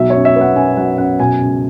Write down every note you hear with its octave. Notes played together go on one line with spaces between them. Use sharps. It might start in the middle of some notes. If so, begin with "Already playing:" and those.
Already playing: B1 B2 F#3 E5
C#5
F#2
E5
B3 F#5
F#2 G#5
F#3 F#5
F#2 F#5
B2 G#5
C#2